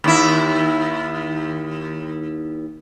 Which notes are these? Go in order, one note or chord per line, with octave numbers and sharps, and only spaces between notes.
D#2 E4